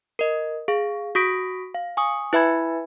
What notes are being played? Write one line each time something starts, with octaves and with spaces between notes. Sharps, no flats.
A#4 D#5
G#4 F5
F#4 C#6 D#6 A#6 B6 D7
F5
G#5 C#6 D#6
E4 B4 E5 G#5 B5 G#6